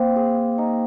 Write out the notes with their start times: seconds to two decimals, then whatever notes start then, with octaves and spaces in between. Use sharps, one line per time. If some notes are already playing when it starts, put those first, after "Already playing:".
Already playing: A#3 C4
0.16 G#4
0.58 D#4